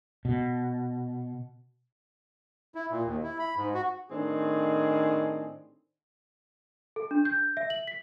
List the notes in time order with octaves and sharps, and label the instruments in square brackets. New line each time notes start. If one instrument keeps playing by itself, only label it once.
[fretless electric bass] B2
[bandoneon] E4
A#2
D#2
E4
B5
G#2
F#4
[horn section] A2 D#3 C4 D4 G#4
[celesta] A4
D4
G6
E5
F#7
B6